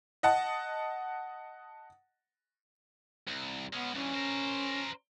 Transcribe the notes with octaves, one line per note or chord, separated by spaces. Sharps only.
D#5 F#5 A5
C2
G#3 B3 C#4
G2 E3 C#4
A#4 C5